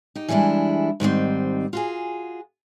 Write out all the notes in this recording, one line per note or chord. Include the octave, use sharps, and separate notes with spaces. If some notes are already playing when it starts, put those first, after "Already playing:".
D#4 G4
E3 G3 G#3 D4 E4
G#2 D#3 G3 C4
F4 F#4 G#4